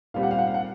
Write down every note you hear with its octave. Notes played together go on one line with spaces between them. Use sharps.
A#2 G3 C4 F5
F#5
F5
F#5
F5
F#5